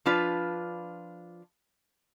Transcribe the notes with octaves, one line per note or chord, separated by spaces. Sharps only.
F3 D4 F4 B4